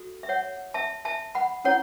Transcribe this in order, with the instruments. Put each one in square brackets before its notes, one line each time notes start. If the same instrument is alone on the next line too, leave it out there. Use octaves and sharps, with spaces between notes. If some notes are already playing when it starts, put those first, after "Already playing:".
Already playing: [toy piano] F#4 A4
E5
C#5 F#5
E5 A5
E5 A5
F#5 B5
C#4 E4 C#5 F#5